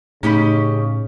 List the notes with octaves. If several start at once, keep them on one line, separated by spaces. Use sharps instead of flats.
A2 C#3 A3 C#4 D#4 G4 D#5 B5